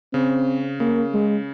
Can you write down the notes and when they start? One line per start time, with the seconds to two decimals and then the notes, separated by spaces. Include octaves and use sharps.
0.13 C#3 C4
0.80 C#3 A#3
1.14 G#3